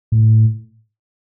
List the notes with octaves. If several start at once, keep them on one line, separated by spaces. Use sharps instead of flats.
A2